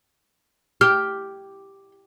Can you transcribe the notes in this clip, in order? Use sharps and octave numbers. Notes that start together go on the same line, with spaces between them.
G4 F6